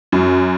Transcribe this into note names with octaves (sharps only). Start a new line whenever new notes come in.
F#2